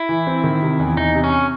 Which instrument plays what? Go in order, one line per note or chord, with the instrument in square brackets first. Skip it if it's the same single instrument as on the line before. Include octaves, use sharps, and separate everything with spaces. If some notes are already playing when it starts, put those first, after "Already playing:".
Already playing: [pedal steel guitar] E4
[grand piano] E3
C4
D#3
C3
E2
[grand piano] E2 [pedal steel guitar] D#4
[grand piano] C3
[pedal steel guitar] C#4